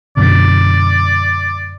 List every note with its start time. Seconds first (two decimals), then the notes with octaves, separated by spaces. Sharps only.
0.17 F#2 B2 D3 D5